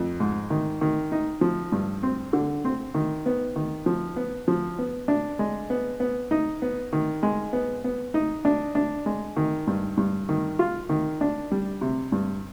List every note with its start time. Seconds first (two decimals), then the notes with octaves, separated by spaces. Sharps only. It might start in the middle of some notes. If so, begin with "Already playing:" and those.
Already playing: F2
0.20 G#2
0.50 D#3
0.81 D#3
1.12 D#4
1.41 F3
1.72 G2
2.03 C4
2.33 D3
2.65 C4
2.94 D#3
3.26 B3
3.56 D#3
3.86 F3
4.16 B3
4.48 F3
4.79 B3
5.08 D4
5.39 G#3
5.70 B3
6.00 B3
6.31 D#4
6.62 B3
6.93 D#3
7.23 G#3
7.53 B3
7.84 B3
8.14 D#4
8.45 D4
8.75 D4
9.06 G#3
9.36 D#3
9.67 G2
9.97 G2
10.29 D#3
10.59 F4
10.89 D#3
11.21 D4
11.51 G3
11.81 C3
12.12 G2